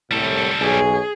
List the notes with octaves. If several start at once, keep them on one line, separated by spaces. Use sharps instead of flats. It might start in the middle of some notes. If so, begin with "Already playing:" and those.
C2 A2 G3 A4
B1 G#4 C#5 G#5